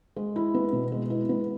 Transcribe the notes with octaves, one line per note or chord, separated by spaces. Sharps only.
G#3
E4
B3
B2
G#3
E4
B3